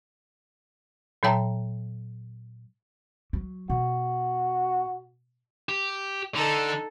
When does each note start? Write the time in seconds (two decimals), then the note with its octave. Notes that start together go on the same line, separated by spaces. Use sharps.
1.23 A#2 F#3 C#5 G5 A5 A#5
3.33 F#3
3.70 B2 F#4
5.69 G4
6.35 D3 D#4 A4